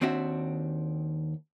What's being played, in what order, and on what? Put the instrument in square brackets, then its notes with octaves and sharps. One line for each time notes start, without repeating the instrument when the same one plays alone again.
[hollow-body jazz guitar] D#2 C4 D4 F#4 E5